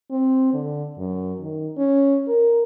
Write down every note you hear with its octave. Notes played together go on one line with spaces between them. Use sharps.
C4
D3
F#2
D#3
C#4
A#4